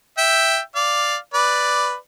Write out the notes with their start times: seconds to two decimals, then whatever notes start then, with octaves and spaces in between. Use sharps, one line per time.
0.18 E5 G5
0.75 D5 F5
1.34 B4 D5